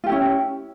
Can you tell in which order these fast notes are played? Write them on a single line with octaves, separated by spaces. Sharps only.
F4 G4 E4 C#4